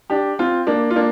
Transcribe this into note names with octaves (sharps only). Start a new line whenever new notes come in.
D4 G4
C4 F4
A#3 D4
F4
A#3 D4